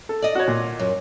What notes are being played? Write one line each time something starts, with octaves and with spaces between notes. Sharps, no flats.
A4
D5 D#5
F#4 C#5
A#2
F#2